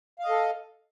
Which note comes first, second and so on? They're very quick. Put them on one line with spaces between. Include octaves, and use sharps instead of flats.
F5 D#5 A4